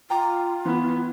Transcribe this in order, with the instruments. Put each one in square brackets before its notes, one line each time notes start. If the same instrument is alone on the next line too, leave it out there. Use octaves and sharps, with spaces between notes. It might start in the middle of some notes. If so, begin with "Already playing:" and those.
[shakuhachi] F4 [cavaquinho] G5 A#5 D6
[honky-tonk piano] E3 [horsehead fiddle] B3